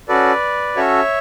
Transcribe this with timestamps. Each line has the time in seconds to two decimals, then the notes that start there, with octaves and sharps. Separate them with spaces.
0.08 C#4 F#4 A4 B4 D5
0.76 C#4 F#4 A4 C#5 E5